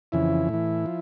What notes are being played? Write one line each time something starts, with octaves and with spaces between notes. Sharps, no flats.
F2 C#3 E3 E4
A2 E3
F3